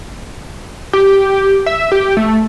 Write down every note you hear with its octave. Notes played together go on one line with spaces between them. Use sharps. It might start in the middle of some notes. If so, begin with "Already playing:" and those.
G4
E5
G4
A3